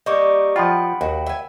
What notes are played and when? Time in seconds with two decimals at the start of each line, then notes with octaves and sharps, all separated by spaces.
0.06 G3 A#3 D#4 D#5 C#6 D6
0.56 F3 F4 D#5 F#5 G5 B5
1.01 D#2 F#4
1.26 E5 G#5